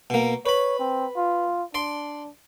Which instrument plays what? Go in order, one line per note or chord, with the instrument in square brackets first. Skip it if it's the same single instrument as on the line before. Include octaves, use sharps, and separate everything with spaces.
[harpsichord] B2 A#3
[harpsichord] B4 B5 [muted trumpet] C#5
[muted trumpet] C4
F4
[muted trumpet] D4 [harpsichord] D5 C6